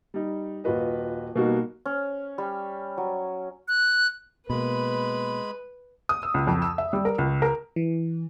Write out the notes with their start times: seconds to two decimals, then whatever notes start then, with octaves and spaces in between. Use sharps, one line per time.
0.14 G3 D#4
0.64 D#1 F4 F#4 B4 D#5
1.35 B2 G3 A#3 D#4 F#4
1.86 C#4
2.38 G3
2.98 F#3
3.68 F#6
4.50 B2 G#3 A#3 B4 B5
6.09 D#6
6.23 E6
6.34 C#2
6.47 F2
6.62 E6
6.78 E5
6.93 G3
7.05 A#4
7.18 C#2
7.42 A#4
7.76 E3